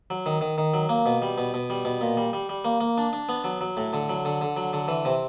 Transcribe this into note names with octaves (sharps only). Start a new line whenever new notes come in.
F#3
D#3
D#3
D#3
F#3
A#3
B2
G3
B2
B2
G3
B2
A#2
G3
G3
G3
A#3
A#3
D4
D4
B3
F#3
F#3
A2
D3
F#3
D3
D3
F#3
D3
E3
C3